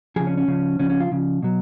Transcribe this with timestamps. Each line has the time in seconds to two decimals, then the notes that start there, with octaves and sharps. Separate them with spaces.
0.16 C#3 F3 G#4
0.27 C#4
0.37 C#4
0.48 C#3 F3
0.79 C#3 F3 C#4
0.90 C#4
1.00 F4
1.11 C#3 F3
1.43 B2 F#3